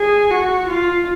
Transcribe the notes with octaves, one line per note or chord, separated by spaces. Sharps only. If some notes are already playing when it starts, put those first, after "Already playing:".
Already playing: G#4
F#4
F4